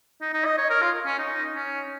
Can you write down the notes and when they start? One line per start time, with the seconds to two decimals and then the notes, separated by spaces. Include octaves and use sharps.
0.21 D#4
0.33 D#4
0.45 D#5
0.58 C#5
0.70 A#4
0.82 F4
1.06 C#4
1.19 D#4
1.55 C#4